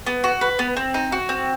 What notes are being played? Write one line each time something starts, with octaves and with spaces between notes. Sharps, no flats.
B3
F#4
B4
B3
C4
D#4
F#4
C4